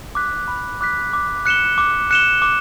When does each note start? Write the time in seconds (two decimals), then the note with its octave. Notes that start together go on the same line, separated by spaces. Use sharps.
0.15 D6 F#6 B6
0.48 B5
0.81 D6 F#6 B6
1.13 D6
1.46 F#6 C#7 E7 G7
1.78 D6
2.11 F#6 C#7 E7 G7
2.42 D6